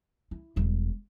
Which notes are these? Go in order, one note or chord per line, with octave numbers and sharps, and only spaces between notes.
E4
E1 G3